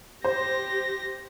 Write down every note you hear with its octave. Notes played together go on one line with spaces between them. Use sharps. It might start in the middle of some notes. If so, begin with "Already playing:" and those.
G4 C5 A#6